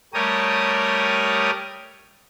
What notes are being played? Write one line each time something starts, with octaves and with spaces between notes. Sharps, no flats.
G3 A3 G4 A#4 C#5 D#6